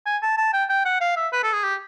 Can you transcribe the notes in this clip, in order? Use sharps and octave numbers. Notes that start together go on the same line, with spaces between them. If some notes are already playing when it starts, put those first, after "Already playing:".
G#5
A5
A5
G5
G5
F#5
F5
E5
B4
A4
G#4
G4